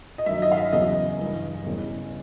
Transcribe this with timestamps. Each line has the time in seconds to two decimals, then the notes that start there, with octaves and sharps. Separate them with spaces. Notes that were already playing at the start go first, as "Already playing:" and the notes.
0.18 D#5
0.26 G2 D#3 F#3 E5
0.42 D#5
0.52 F5
0.57 E5
0.73 E2 C#3 F#3 D#5
1.19 G2 E3 G3
1.65 E2 C#3 E3 G3